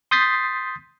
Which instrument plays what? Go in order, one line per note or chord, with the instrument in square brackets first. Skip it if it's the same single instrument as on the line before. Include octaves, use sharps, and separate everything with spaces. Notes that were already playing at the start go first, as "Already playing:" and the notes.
[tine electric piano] C6 D#6 G6 A6 B6 C7